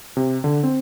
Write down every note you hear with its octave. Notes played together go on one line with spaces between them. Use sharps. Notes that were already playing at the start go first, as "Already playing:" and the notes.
C3
D3
C4